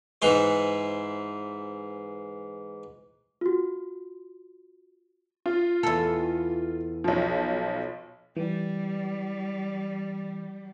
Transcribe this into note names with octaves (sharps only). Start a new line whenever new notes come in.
G#2 E3 C5
F4 F#4
F4
E2 A4
B1 F3
E3 G3